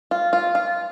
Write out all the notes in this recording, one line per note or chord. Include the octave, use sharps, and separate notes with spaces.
F4
F4
F4